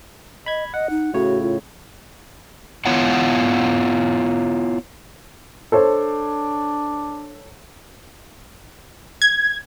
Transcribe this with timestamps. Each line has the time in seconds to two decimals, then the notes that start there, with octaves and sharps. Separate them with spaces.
0.46 D#5 B5 G#6
0.74 D#5 F#5
0.90 D#4
1.14 A2 C#3 F#4 C#5
1.42 F4
2.86 B3 E4 F4 C#5 F#5
5.72 D4 A4 C5 C#5
9.22 G#6